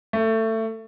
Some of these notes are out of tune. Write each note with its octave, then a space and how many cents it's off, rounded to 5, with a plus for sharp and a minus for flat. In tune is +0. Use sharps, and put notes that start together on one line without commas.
A3 +20